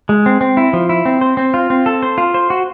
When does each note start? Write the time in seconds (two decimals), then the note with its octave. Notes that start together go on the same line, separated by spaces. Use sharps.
0.09 G#3
0.26 C4
0.41 C4
0.57 E4
0.73 F3
0.89 E4
1.05 C4
1.21 C5
1.37 C4
1.54 F4
1.70 C4
1.86 A4
2.03 C5
2.18 F4
2.34 C5
2.50 F#4